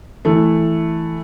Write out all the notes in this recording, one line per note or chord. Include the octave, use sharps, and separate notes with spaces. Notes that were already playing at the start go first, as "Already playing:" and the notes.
E3 A3